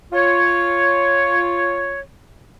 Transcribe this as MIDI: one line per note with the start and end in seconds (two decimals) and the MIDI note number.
0.13 2.00 65
0.13 2.00 73